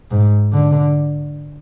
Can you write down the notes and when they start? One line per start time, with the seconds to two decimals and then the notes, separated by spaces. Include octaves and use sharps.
0.11 G#2
0.53 D3